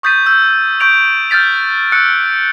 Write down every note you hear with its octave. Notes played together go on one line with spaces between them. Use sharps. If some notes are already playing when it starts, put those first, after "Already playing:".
C#6 D#6 G6 A6 B6 D#7
E6 G6
C#6 G6 D7 F7
F6 G6 A6 B6 F7
E6 F#6 C#7